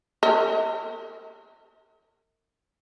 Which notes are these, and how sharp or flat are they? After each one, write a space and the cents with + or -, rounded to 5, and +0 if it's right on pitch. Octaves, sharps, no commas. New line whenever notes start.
A#4 -45 D#5 +45